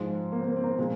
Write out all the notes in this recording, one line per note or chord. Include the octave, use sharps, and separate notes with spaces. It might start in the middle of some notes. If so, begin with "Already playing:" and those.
Already playing: G#2 F3 G#3
A#3
C4
A#3
C4
A#3
A#2 F3 G#3